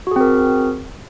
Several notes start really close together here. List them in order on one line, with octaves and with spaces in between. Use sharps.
F#4 G#4 C4 A#4